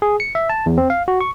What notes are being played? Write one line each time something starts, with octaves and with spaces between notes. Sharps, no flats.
G#4
C#7
E5
A5
E2
C4
F5
F#4
C#6